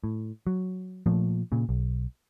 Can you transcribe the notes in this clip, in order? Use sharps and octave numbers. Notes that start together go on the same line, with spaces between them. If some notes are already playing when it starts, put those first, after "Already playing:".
A2
F#3
A#2 F3 A3
A#2 C#3
B1